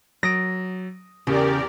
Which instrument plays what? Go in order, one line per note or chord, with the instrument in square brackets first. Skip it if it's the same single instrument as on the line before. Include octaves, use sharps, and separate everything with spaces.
[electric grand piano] F#3 D#6 D7 [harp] A#6
[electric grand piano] E2 [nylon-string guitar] C#3 [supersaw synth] G4 A#4 D5